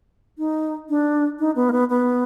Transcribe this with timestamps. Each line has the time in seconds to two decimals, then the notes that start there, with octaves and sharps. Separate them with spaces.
0.38 D#4
0.89 D4
1.39 D#4
1.56 B3
1.69 A#3
1.72 B3
1.90 B3